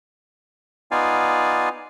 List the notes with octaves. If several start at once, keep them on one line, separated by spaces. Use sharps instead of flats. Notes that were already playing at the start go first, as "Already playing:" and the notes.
B3 D#4 F4 D5 F5 G#5